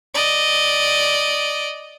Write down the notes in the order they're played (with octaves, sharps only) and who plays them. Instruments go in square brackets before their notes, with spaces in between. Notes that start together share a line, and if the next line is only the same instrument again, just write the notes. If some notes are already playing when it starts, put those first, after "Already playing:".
[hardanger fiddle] D5 D#5